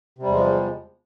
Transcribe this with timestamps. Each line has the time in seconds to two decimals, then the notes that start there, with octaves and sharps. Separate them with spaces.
0.18 C3
0.23 G3
0.27 E2
0.31 G#3
0.35 F3